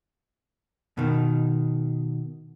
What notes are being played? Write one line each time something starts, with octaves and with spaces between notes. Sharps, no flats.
B2 D#3